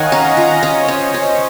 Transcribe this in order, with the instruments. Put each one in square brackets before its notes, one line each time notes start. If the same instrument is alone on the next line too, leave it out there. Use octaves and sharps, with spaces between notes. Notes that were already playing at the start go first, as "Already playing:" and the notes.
Already playing: [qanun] D#3 [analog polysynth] C#5 D#5 F5 F#5 G#5
[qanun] C#4 [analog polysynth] A#5
[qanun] F4 [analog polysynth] A#5
[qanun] C#4 [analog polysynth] D#5
[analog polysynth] C#5
C5
[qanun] C#4 [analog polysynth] C#5
[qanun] C#4